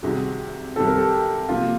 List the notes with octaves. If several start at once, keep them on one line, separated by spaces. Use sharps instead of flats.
C2 C3 D#3 F#4 G#4
C2 C3 D#3 A4
A#4
G4 A4
C3 F3 A#3 F4